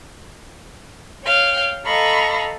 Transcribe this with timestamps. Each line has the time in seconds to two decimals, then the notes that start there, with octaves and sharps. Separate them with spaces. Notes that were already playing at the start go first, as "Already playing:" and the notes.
1.25 C#5 F5 G5
1.85 A4 D#5 F5 A#5 B5 C#6